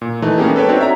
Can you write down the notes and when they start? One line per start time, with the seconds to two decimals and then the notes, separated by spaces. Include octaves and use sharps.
0.01 A#2
0.22 E3 A3 D#4
0.38 G#3 A#3 B3 C#4 G4 G#4
0.56 A4 B4 C#5 G5
0.69 C4 D4 D#4 F#4 C#5
0.81 E5 A#5